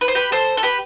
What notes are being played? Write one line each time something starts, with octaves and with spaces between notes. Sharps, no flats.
B4
C5
G4 B4
A4 C5
A4
G4 B4